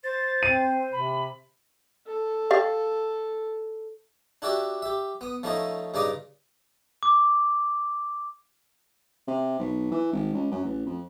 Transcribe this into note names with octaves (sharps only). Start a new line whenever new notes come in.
C5 A6
C4 D#7
C3 B5
A4
G4 D5 F5
D4 E4 F#4 G4 D5 E5
G4 E5
B3 D#6
F3 A3 C#4 D#4 E4 D#5
G2 C#3 D#4 D5 D#5 D6
D6
C3
B1
E3
G#1
C#2
F#2
A1
F2